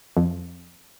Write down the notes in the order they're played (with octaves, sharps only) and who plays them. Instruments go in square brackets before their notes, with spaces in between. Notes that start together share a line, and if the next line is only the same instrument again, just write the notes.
[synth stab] F2